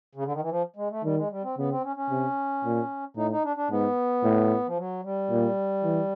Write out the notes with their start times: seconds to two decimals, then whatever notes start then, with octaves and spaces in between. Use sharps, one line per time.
0.15 C#3
0.24 D3
0.32 D#3
0.41 E3
0.51 F3
0.76 G#3
0.90 A3
1.03 D#3 G3
1.16 G#3
1.31 G3
1.43 C4
1.57 C#3 B3
1.70 C4
1.84 C#4
1.96 C#4
2.10 C3
2.64 A#2
3.16 A2 D#4
3.31 D#4
3.44 D4
3.56 D4
3.70 G#2 B3
4.24 A2
4.67 F3
4.77 F#3
5.04 G3
5.31 A#2
5.84 E3